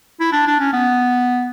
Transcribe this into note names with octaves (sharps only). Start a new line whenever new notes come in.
E4
D4
D4
C#4
B3